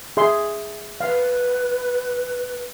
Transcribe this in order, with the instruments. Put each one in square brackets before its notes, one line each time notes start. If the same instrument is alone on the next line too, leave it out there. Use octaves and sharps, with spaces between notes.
[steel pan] G#4 E5 C6
[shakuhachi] B4 [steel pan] F5